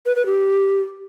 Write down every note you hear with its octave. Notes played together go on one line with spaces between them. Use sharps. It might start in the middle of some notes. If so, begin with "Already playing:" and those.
B4
B4
G4